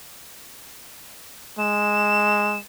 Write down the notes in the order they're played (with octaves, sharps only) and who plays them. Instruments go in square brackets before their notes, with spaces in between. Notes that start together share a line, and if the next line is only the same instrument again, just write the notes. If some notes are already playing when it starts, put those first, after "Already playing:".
[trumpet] G#3 [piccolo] E7